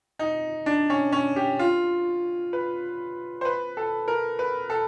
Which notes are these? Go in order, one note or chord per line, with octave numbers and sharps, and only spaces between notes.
D#4
D4
C#4
C#4
G4
F4
B4
C5
B4
A4
A#4
B4
A4